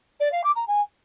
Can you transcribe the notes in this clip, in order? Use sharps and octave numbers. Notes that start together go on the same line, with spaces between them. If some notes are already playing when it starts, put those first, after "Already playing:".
D5
F5
D6
A#5
G#5